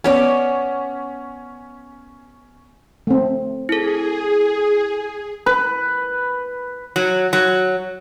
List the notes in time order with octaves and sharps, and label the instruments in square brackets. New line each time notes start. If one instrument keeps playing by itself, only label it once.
[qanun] B3 C#5 D5 [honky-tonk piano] C#4
[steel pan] A3 C4
[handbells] E4 A4 [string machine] G#4
[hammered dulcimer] B4
[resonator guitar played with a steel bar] F#3
F#3